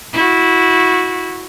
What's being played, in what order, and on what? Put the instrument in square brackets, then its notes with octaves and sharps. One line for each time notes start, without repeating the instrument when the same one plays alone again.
[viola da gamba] E4 F#4